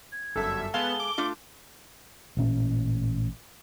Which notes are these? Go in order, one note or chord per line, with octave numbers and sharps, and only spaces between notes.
G#6
G1 F#2 A4 E5
G#3 B3 F5 A5 G7
D6
A3 D4 F4
A1 A#2 C#4